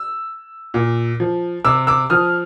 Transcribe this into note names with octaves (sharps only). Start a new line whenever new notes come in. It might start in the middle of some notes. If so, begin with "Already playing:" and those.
Already playing: E6
A#2
F3
C3 D6 E6
D6 E6
F3 D#6 F6